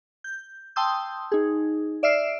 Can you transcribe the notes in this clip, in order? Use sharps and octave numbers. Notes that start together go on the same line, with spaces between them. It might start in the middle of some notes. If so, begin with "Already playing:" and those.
G6
G5 A5 C6 D#6 E6 G6
D#4 G#4
D5 E5 E6 F6 C7 D7